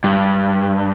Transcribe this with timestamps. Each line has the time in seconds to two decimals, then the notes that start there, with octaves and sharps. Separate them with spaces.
0.04 G2